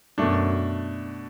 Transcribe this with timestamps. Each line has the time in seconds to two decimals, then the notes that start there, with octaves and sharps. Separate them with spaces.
0.18 F#2 B2 A3 D4